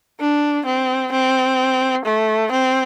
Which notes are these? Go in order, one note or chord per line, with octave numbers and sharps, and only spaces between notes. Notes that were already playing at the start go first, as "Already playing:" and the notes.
D4
C4
C4
A3
C4